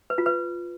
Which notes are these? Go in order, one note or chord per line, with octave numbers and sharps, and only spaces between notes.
B4
F4
B4